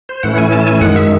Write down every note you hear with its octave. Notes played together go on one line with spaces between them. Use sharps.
C5
A2 E3 A3 C#4 E4 F#5
G#5
A5
G#5
F#2 D#3 G#3 F#5
E5